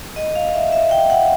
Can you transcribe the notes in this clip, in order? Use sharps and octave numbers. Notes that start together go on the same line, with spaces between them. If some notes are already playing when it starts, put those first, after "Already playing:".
D#5
F5
E5
E5
G5
F#5